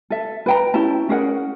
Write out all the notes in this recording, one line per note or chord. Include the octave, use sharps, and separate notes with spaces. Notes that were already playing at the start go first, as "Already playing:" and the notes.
A4 E5
B4 G5 A#5
C#4 E4 G4 A5
C#4 G#4 A#4 F#5